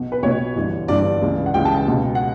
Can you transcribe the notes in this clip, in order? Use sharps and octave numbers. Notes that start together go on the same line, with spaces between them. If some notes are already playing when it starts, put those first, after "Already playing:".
Already playing: B1 B2
B4
B1 B2 C#5
G1 G2 E3
G1 G2 E3 D5
D5
C#2 C#3 E3
F#5
C#2 C#3 E3 G5
A5
G5
C#2 B2
F#5